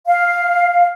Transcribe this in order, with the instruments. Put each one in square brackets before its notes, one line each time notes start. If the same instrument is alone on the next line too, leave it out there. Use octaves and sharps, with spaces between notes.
[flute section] F5